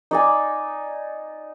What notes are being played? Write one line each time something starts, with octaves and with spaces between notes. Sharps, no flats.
D#4 D5 G#5